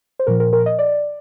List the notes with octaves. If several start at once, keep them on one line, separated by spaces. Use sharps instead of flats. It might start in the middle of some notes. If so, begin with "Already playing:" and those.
C5
A#2 F3 A#4
A#4
A#4
D#5
D5